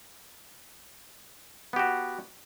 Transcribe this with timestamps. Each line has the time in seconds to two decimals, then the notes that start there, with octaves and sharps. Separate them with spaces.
1.73 B3
1.76 G4
1.79 F#4